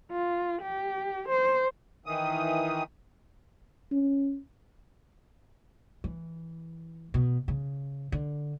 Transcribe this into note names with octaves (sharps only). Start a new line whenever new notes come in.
F4
G4
C5
D#3 E3 D#6
C#4
E3
B2
C#3
D3